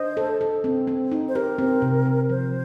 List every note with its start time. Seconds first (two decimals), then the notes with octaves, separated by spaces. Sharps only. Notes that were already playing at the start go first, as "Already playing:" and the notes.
Already playing: D4 C5 D#5
0.17 A4
0.41 A4
0.64 C4
0.87 C4
1.12 D#4
1.28 C5
1.35 G4 A#4
1.58 C4
1.82 C3
2.06 C4
2.29 F3 C5